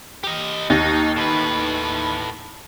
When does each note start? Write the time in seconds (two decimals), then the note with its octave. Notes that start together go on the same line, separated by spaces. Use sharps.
0.24 G4 D#5
0.70 D#2 D#4
1.16 A2 B4